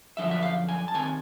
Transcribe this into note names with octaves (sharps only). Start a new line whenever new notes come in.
F#2 D3 F3 E5
E5
F5
G#5
A5
C3 D#3 G#5